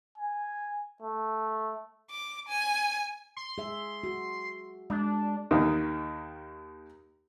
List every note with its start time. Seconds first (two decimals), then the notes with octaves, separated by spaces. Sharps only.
0.18 G#5
1.02 A3
2.10 D6
2.48 G#5
3.37 C6
3.58 G#4 E5
4.04 F#4
4.90 G#3 D4
5.51 D#2 D#3 D#6